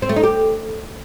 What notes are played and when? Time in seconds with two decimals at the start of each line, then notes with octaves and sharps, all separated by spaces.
0.02 C4
0.09 A3
0.16 D#4
0.23 G4